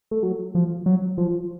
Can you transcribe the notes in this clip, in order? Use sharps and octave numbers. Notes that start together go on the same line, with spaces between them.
A3
F#3
F3
F#3
F3